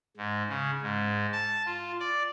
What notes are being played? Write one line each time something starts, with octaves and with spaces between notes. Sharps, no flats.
G#2
C#3
G#2
A5
F4
D5